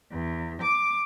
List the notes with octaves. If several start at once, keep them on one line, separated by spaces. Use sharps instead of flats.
E2
D6